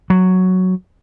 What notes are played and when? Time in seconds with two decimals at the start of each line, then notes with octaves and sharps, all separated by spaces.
0.10 F#3